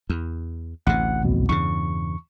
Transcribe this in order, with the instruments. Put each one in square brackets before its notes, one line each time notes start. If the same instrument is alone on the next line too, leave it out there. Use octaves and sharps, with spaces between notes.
[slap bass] E2
[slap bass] A1 D2 C3 [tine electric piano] F#5
[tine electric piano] C2 F2 B2
[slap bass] E2 G2 C#3 [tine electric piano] C#6